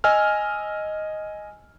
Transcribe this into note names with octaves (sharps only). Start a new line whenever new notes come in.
D#5 G#5 E6 F6